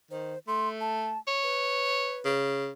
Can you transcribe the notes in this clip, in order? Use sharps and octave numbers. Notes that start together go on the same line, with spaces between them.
D#3 C5
A3 C6
A5
C#5
B4
C#3